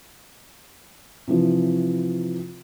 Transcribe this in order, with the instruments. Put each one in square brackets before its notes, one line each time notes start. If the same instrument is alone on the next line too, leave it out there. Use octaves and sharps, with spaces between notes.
[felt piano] C3 E3 F3